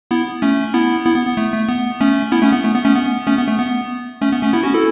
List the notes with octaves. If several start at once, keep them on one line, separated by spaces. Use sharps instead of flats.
B3 E4
A3 C#4
B3 E4
B3 E4
B3
B3
A3
A3
B3
A3 C#4
B3 E4
A3 C#4
B3
A3
B3
A3 C#4
B3
A3 C#4
B3
A3
B3
A3 C#4
B3
A3 C#4
B3 E4
C#4 F#4
E4 A4